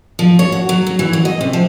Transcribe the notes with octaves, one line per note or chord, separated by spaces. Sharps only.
F3
C#5
F#4
F#3
F#3
E3
F#3
D#5
C3
F3